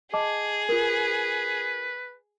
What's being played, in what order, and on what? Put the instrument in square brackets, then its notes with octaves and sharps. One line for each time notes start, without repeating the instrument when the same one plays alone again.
[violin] G#4 [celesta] D#5 A5 D6
[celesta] F4 A#4 [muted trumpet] B4